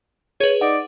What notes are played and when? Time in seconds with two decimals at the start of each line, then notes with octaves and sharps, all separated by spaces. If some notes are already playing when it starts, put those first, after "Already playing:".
0.40 G#4 B4 C#5
0.61 D#4 D5 F#5